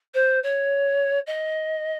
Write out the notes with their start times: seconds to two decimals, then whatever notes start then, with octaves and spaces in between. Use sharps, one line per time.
0.14 C5
0.43 C#5
1.26 D#5